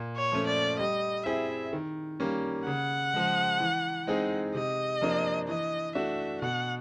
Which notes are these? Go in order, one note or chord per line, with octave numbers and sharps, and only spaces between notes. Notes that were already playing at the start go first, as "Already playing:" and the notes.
Already playing: A#2
C#5
F3 A3 C#4
D5
G3 D#5
C4 E4 G#4 E5
D#3
G3 A#3 C#4
C#3 F#5
F3 G#3
E3
G#3 C4 D#4 G#4
C3 D#5
F3 A#3 D4
E3 D#5
A3 D4 F#4 E5
B2 F#5